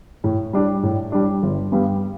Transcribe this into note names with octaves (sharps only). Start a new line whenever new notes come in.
A2
G3 D4
A2
G3 D4
G1
G2 G3 B3